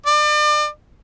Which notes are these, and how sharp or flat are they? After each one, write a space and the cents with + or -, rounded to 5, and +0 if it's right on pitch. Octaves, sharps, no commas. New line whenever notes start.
D5 +35